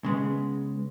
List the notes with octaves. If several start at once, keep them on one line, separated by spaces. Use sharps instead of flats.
C#3 G#3 B3